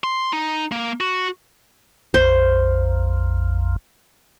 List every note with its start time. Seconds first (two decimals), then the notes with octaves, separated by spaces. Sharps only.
0.04 C6
0.33 D#4
0.72 A#3
1.01 F#4
2.14 A#1 F2 C5